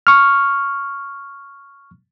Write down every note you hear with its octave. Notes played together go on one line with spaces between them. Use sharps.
C#6 F6